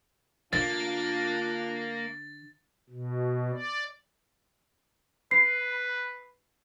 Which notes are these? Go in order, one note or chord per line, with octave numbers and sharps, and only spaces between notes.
D3 A#3 D4 F4 A6
B2
D5
B4 C7